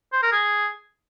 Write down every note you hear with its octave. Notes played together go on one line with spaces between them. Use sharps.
C5
A#4
G#4